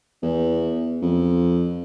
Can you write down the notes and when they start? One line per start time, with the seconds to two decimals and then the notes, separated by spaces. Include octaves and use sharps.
0.23 E2
1.02 F2